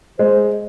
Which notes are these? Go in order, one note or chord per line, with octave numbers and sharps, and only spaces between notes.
G#3 C5